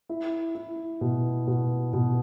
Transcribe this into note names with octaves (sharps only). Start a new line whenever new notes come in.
E4
E4
B2
B2
B2